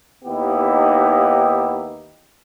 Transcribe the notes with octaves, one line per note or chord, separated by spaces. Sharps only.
D#2 B3 D#4 E4 G4